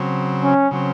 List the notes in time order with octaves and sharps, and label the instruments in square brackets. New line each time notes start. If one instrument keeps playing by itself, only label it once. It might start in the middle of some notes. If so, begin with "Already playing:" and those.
Already playing: [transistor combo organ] C#3 F#3 C4
[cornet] C#4
[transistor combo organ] C#3 F#3 C4